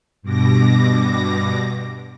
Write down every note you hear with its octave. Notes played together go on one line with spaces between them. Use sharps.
G2 B2 D6 A#6